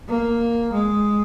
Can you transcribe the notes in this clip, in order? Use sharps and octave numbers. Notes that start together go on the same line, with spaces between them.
A#3
G#3